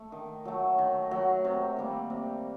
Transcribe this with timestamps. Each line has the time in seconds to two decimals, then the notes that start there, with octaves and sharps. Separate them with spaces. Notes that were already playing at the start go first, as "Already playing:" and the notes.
Already playing: A3
0.12 D#3
0.45 F#3 A3
0.78 D#3
1.11 F#3 A3
1.45 C3
1.77 D#3 G3 A#3
2.10 C3